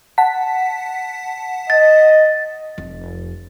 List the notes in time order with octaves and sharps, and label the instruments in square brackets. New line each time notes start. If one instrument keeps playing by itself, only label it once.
[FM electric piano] F#5 A5 B6
[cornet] D#5 [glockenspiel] A6
[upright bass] F1